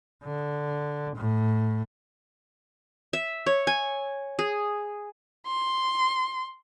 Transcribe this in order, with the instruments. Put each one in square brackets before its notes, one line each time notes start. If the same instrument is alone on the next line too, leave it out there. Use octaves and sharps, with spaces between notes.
[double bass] D3
A2
[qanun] E5
C#5
G#5
G#4
[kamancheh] C6